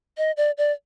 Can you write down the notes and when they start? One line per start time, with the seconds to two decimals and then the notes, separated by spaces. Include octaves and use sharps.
0.17 D#5
0.37 D5
0.58 D5